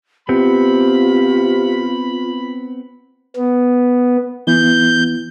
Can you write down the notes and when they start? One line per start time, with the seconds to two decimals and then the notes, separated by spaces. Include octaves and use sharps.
0.29 C3 B3 C4 F4 B5
3.36 B3
4.47 E3 B3 E4 G6